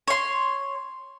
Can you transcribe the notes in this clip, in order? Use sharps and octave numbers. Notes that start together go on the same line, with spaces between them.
C#5 C6